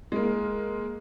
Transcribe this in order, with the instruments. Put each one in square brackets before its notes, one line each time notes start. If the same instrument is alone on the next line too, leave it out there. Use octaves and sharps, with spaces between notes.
[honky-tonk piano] G#3 A#3